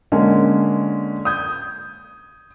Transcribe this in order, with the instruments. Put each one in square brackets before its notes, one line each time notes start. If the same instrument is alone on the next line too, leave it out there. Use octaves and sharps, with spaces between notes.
[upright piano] D3 G#3 A#3 C#4
D#6 G6 G#6